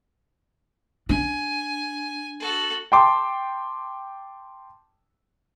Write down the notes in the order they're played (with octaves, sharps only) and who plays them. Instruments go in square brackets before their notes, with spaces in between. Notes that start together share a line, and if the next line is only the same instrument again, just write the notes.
[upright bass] D4 [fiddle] G#5
[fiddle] F#4 A4
[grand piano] G5 A5 C6 D6